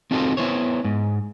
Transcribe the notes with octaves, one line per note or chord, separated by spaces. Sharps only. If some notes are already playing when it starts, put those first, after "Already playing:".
C4 D#4 F4 F#4 A4 C5
B3 E4 C5 C#5
G#2